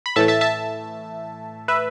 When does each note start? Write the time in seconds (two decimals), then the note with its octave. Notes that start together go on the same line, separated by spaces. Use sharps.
0.06 B5
0.16 A2 E3 A3 E5 A5
0.28 E5 A5
0.41 E5 A5
1.68 B4 E5